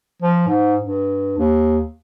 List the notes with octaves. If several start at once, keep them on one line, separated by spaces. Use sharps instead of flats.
F3
G#2
G2
D#2